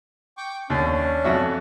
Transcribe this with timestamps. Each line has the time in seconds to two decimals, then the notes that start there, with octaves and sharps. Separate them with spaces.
0.37 G5 C#6 D6
0.70 D#2 C#4 D4
1.24 F2 F#4 E5